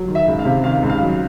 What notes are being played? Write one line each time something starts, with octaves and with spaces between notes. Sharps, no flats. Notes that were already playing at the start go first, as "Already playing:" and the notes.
Already playing: F#3
D#3
E5
C#2
F5
C3
D#3 F5
C#2
F5
F#3